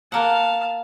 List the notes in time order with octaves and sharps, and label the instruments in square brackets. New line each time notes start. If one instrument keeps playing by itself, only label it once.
[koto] A#3 F#5 [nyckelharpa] F5 A5